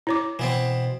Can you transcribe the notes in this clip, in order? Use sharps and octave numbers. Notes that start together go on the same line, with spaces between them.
E4 C#5 D6
B2 E3 B3 C4